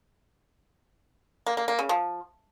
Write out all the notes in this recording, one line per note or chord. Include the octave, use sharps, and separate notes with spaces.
A#3
A#3
A#3
C#3
F3